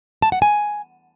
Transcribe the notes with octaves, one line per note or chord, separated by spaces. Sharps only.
A5
F#5
G#5